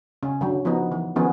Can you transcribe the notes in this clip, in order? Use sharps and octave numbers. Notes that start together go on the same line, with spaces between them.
C#3 C#4
D3 F#3
F3 B3 D#4
E3
D#3 F3 B3 C#4 G#4